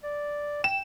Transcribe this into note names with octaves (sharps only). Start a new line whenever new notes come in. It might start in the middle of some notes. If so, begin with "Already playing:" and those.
D5
G5 E7